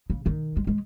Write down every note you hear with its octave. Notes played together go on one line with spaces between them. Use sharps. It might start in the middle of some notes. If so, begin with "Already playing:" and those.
C#3
D#3
G#3
G#3